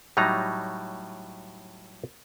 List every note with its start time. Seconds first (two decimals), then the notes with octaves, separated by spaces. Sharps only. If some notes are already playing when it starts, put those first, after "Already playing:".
0.17 A2 F#3 G3 D#4 A#5